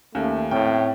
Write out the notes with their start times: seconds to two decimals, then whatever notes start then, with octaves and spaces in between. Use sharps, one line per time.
0.15 D#2 A3 C#4 F5
0.51 A2 A3 C4 C#5 G5